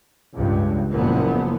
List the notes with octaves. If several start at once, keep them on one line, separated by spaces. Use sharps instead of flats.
C#2 G2
F#1 F#2 A#2 F3 B3